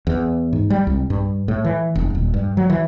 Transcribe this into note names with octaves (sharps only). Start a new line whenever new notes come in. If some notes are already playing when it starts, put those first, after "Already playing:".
E2
G#2
G3
C2
G2
A2
E3
F1
D#1
G2
F#3
E3